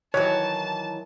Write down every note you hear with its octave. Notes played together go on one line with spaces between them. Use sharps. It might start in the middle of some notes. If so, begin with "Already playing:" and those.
D#3 E3 F#3 C#5 A5